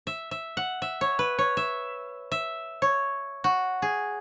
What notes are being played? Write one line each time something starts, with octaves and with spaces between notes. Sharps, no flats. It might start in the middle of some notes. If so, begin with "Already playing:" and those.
E5
E5
F#5
E5
C#5
B4
C#5
E5
E5
C#5
F#4
G#4